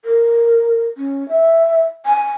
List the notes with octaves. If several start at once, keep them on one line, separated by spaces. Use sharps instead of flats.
A#4
C#4
E5
G#5